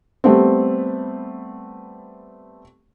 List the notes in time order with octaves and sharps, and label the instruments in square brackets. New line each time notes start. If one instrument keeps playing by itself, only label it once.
[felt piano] G3 A3 B3 C4